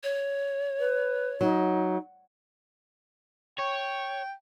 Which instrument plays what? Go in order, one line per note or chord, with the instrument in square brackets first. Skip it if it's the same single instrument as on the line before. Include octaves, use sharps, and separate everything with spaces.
[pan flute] C#5
[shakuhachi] B4
[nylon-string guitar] F#3 [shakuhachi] D#4
[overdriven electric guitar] C#5 [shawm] G5